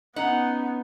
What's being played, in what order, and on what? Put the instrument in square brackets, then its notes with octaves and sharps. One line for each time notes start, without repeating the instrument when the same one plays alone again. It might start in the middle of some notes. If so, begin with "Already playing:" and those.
[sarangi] B3 [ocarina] C#4 [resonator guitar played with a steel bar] D#4 [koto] F#5